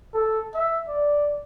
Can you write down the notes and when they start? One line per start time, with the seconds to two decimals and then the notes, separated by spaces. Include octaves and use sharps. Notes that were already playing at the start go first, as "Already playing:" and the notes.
0.14 A4
0.54 E5
0.88 D5